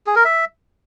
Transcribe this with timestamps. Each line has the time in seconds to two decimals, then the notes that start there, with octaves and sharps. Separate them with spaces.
0.07 G#4
0.16 A#4
0.25 E5